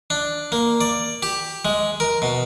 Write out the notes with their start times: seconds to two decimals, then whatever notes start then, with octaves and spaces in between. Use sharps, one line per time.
0.10 D4
0.52 A#3
0.81 D5
1.23 G4
1.65 G#3
2.00 A#4
2.22 B2